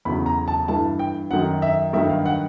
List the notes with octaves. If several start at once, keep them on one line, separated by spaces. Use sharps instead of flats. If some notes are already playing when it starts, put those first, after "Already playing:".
E2 C#3 F#3 B5
A#5
A5
G2 E3 A5
G5
F#2 D#3 F#3 F#5
E5
G2 D#3 F#3 E5
F5
F#5